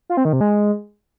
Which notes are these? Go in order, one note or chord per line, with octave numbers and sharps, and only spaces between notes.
F4
C4
D#3
C3
G#3